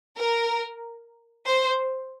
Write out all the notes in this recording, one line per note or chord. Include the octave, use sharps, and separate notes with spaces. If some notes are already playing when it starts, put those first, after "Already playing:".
A#4
C5